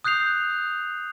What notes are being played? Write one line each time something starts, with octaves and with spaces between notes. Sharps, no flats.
D#6 F#6 G6 C7 F7